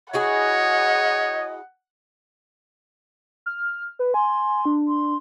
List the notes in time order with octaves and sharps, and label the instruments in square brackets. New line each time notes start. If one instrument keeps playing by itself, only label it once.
[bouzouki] E4 F#4 G#4 [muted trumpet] C#5 [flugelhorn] D#5 [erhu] F#5
[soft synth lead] F6
B4
[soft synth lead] G#5 [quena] C6
[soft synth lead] D4
[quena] C6